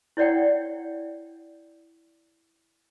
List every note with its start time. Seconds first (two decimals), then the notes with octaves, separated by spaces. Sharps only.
0.17 E4 C#5 D5 F#5 G5